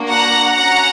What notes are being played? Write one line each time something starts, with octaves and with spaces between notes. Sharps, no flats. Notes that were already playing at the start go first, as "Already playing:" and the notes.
Already playing: A#3 D4 F#4
F#5 A#5
C#4 F#4 F#5 A#5